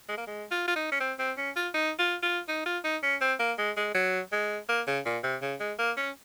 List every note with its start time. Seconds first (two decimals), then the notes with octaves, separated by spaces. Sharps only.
0.09 G#3
0.18 A#3
0.27 G#3
0.51 F4
0.68 F4
0.76 D#4
0.92 C#4
1.00 C4
1.19 C4
1.37 C#4
1.56 F4
1.74 D#4
1.99 F4
2.23 F4
2.48 D#4
2.66 F4
2.84 D#4
3.03 C#4
3.21 C4
3.40 A#3
3.58 G#3
3.77 G#3
3.94 F#3
4.32 G#3
4.69 A#3
4.87 C#3
5.05 A#2
5.23 C3
5.42 C#3
5.60 G#3
5.79 A#3
5.97 C#4